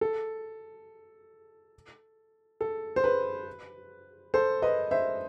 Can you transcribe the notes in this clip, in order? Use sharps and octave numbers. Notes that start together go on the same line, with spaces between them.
A4
A4
C5
B4
A4 C5
B4 D#5
C5 E5